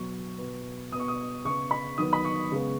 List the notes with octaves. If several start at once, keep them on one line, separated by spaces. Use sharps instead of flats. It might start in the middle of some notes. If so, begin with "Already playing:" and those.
Already playing: B2 F#3 B3 C#6
B2 B3
B2 B3 C#6 D#6
D#6
C#3 B3 C#6
B5
D#3 F#3 B3 D#6
B5
C#6
C#3 G#3 B3